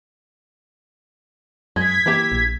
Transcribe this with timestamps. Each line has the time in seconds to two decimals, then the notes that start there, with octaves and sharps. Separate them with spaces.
1.76 F#2 G#3 G#6 B6
2.06 E3 A#3 E4 G4
2.32 A#1